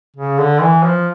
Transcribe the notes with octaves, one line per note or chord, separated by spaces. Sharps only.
C#3
D3
E3
F3